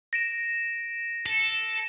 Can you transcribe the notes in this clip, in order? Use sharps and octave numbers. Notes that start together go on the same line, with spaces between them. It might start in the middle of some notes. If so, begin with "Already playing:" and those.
A#6 D7 E7
A4